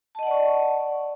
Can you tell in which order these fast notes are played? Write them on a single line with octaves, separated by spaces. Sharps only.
A5 D#5 F#5 D5 C#6